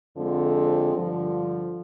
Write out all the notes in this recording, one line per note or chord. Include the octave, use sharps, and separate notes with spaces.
F2 D3 F3 G#3 C4
G2 D3 F3